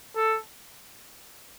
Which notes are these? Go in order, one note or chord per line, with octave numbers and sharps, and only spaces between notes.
A4